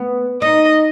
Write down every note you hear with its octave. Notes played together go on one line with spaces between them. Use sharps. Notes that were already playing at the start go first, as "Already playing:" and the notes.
Already playing: B3
D#4 D#5